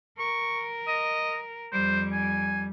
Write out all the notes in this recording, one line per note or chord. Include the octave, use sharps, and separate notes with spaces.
A#4 C#6
D#5
F2 G3 C5
G#5